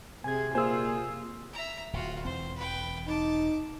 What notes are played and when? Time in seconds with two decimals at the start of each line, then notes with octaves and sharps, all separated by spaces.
0.24 C3 G#4 G#5 G#6
0.55 A#2 F4 G#4 C5 G#5 E6
1.53 E5 A#5
1.93 D1 A2 F4 F#4
2.25 E1 E3 C4 C5
2.56 B4 G5
3.08 D#4 A5 D6